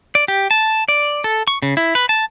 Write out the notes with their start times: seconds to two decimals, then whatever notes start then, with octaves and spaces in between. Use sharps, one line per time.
0.15 D5
0.28 G4
0.51 A5
0.88 D5
1.24 A4
1.48 C#6
1.62 C#3
1.77 E4
1.95 B4
2.09 A5